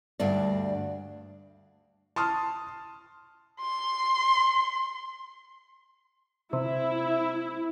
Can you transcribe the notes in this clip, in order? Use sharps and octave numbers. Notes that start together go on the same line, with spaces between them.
D2 G2 D4 D5
A5 C6 D#6 F6
C6
C3 E4